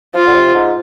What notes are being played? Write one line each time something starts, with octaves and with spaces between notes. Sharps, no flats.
F3 F4
D3
C3
G#2